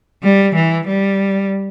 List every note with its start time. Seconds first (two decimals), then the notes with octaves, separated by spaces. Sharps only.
0.23 G3
0.55 E3
0.88 G3